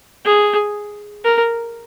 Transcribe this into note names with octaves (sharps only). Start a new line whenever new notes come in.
G#4
A#4